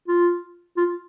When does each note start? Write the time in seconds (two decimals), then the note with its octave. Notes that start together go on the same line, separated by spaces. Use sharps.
0.08 F4
0.77 F4